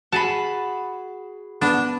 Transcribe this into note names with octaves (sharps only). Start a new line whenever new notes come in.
F#4 G#4 A5 B5
B3 D4